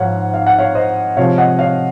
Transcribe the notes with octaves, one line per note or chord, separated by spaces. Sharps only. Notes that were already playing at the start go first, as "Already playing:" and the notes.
Already playing: G#2 F3 G#3 C#5 F5 F#5
F5
F#5
C#5 F5
C5 D#5
C3 F3 G#3 C#5 F5
D#5 F#5
C#5 F5